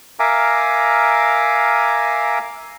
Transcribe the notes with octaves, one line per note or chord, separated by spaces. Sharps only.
A#4 E5 F5 G#5 A#5 D6